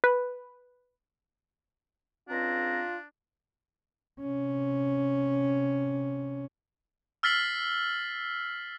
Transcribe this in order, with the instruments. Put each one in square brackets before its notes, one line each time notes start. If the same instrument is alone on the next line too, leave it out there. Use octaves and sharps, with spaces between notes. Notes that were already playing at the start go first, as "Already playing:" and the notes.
[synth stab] B4
[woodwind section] C#2 C4 A#5 [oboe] D4 [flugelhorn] F4
[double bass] C3 C#4
[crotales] E6 F6 A6 B6 C7 F#7